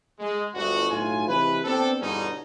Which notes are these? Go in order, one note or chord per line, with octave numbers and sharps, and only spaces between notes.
G#3
G1 D2 F#4
B1 A2 F4 G#5
C3 E3 G#3 B4
B3 C4 D4 A4
E2 G2 B2 D3 C#4 D#4